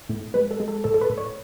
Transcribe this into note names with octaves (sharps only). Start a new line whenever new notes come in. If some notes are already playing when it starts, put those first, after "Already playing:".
A2
G#3 B4
A4
G#3
A4
A2 A4
A4
B4
A2
C#5